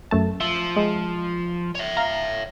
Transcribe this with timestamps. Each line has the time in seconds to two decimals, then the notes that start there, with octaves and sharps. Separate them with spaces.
0.11 F#2 A3 A5
0.40 F3 E5
0.76 G#3
1.75 C#5 E5
1.97 F5 A#5